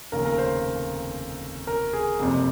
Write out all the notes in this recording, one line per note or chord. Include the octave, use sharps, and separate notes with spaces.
F1 D#2 C#3 A#4
A#4
C5
C5
A#4
G#4
F#1 F2 C3